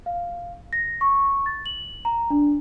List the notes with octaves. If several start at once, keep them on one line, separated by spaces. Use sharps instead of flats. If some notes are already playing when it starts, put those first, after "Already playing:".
F5
A#6
C#6
A6
F#7
A#5
D4